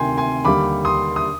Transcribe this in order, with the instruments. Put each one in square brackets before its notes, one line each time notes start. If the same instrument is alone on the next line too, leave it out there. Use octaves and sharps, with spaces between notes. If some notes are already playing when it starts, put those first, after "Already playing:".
Already playing: [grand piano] D2 C3 D#3 G5 G#5 C6
G#5 C6
D#2 D3 G3 B5 D6
C6 D#6
D#6